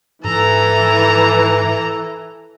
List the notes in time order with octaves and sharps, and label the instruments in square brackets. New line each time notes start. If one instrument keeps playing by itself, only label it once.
[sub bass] G#2 [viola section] E3 [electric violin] A4 A#5